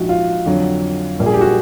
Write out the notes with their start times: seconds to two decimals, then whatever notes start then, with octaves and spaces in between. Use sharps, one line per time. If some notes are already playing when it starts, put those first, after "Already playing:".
Already playing: A#1 G#2 F3 F#4
0.09 F4
0.46 F2 D3 F#3
1.19 A#1 A#2 G3
1.26 G#4
1.34 G4
1.41 F#4